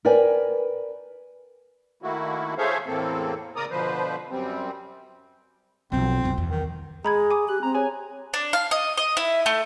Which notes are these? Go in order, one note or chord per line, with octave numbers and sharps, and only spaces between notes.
A#4 B4 D5 G5 G#5
D#3 A3 A#3 E4 F#4
G#4 A4 C5 C#5 E5 F5
E2 A2 A#3 C4 A4
C#3 A#4 D5 A#5 D#6
B2 D3 F3 B4 C5
F#2 G3 C4
B1 F3 C4
B1 F#2
E2
D#3
G#3 G#4 A#5 B5 G#6
G#5 D6 D#6
G4 F#6
C4 A#5
G#4 C#5 G#5
D4
F5
D#5
D#5
E4
A3